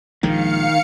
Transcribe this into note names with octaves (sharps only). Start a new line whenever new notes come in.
A#1 D#3 F3 G#3 F5 C#7